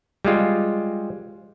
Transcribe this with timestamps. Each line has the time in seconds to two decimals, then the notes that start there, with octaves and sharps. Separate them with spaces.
0.25 G3 G#3 F4